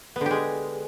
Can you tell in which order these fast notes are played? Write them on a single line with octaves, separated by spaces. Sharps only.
B3 D3 G4 G#3